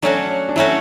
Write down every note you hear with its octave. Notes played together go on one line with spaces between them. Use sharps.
F#3 A3 C#4 D4 F#4
D4
F#3 A3 C#4 E4 F#4